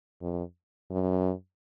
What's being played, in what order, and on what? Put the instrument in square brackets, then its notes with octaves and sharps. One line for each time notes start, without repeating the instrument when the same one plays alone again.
[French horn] F2
F#2